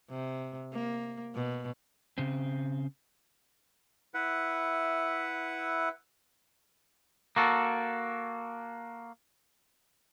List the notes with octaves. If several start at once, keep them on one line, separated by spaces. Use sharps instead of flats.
C3
A#3
B2
C#3 C4
E4 B4 E5 F#5
A#3 F#4 A4